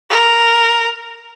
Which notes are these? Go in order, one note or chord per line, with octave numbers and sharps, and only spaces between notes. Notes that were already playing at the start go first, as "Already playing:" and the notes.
A#4